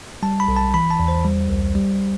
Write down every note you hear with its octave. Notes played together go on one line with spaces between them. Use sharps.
G3 A5
B5
B1
A5
E3 B5
A5
E2
C5
G3
C2
G3